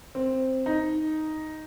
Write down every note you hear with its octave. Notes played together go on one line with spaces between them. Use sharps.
C4
D#4